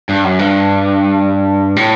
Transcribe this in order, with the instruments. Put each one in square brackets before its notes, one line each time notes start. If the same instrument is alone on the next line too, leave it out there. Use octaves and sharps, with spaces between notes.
[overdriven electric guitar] G2
F#2
G2
A2